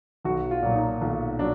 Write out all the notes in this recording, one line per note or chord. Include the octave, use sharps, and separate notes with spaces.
B1 F#4
F4
A#2 F#3
D#4
B1 F4
F#3 D4